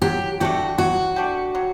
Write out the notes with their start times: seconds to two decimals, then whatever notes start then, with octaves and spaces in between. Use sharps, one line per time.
0.02 F#3 G4
0.40 A3 D4 F#4 G4
0.78 F#3 F#4
1.16 A3 D4 G4
1.55 F#3